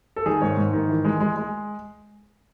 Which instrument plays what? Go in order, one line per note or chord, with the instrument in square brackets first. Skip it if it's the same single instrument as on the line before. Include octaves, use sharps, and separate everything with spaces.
[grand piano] A4
D#3 G#4
G#2 C#5
G#2
D#3
E3
G#3
G#3
G#3